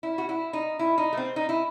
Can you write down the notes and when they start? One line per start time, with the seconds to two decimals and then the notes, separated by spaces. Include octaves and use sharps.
0.03 E4
0.18 F#4
0.29 E4
0.53 D#4
0.79 E4
0.98 D#4
1.13 A3
1.17 C4
1.36 D#4
1.49 E4